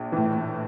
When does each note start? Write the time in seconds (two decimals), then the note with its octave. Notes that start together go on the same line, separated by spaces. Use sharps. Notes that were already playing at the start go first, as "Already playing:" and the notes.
Already playing: A#1
0.12 A2 E3